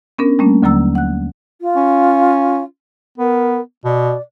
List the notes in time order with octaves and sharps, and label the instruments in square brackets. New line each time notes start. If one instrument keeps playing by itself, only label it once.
[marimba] B3 C#4 D4 A#4
G3 A3 A#3 C#4 D4
D#2 D3 F#3 A#3 A#5 E6
F#5 F#6
[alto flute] F4
[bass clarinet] C#4
[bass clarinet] B3 [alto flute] A#4
[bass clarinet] B2 [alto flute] D5